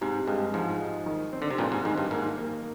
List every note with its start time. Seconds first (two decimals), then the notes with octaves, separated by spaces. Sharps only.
0.01 G#2 C3
0.27 G2 G#3
0.54 G#2 F3
0.80 D#4
1.06 D#3
1.33 C4
1.42 D3
1.51 C3
1.58 G2 A#2 C4
1.72 G#2
1.85 G#2 D#3
1.98 G2
2.11 G#2 A#3
2.38 A#3